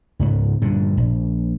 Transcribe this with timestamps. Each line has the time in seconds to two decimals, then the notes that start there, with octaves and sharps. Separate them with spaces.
0.19 C#2 G#2 B3
0.61 G2 A#2 D3
0.97 A#1